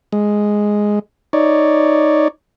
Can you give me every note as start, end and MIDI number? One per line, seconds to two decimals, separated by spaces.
0.12 0.99 56
1.33 2.28 63
1.33 2.28 73
1.33 2.28 74